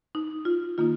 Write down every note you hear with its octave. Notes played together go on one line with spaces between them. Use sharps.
D#4
F4
D#3 A#3 D#4 F4